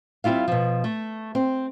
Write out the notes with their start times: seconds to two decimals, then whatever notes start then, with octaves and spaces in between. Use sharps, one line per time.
0.24 G3 C4 E4 F4 F5
0.48 B2 F3
0.84 A3
1.35 C4